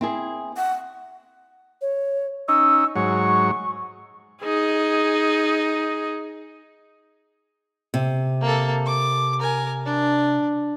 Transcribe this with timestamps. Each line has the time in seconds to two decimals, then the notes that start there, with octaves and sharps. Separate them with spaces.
0.01 C4 E4 G#4
0.57 F#5
1.82 C#5
2.48 C#4 D#4 E6
2.96 G#2 F#3 C#5 C#6
4.43 D#4 G#4
7.94 C3
8.41 A#3 A4
8.86 D6
9.40 A#4 G#5
9.86 D4